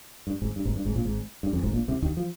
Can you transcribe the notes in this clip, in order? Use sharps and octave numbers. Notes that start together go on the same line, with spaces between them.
G2
G#1 G#2
G2
G#1 G#2
G2
G#1 G#2
A#1 A#2
G#1 G#2
G2
F2
G#1 G#2
A#1 A#2
C2 C3
D#2 D#3
F3